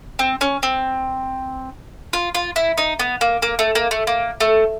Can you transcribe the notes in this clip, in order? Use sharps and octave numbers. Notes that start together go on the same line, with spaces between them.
C4
C#4
C4
F4
F4
E4
D#4
B3
A#3
A#3
A3
A#3
A3
A#3
A3